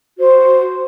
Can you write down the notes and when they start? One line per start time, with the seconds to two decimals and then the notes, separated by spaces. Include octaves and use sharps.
0.19 F#4 C5